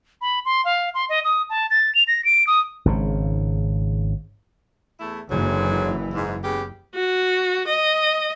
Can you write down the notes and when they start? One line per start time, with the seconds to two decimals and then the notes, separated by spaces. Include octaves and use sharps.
0.21 B5
0.45 C6
0.65 F5
0.94 C6
1.09 D#5
1.24 D#6
1.50 A5
1.70 A6
1.95 F7
2.08 A#6
2.25 D7
2.47 D#6
2.85 G#1 G#2 C#3
5.00 E2 A3 E4
5.30 F#1 G#2 D3 E3 F#3
6.14 G#2
6.43 C#3 B3 G4
6.95 F#4
7.67 D#5